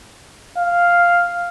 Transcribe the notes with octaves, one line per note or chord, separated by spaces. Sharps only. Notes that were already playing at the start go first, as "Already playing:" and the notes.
F5